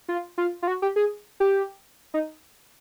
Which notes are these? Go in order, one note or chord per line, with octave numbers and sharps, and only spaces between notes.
F4
F4
F4
F#4
G4
G#4
G4
D#4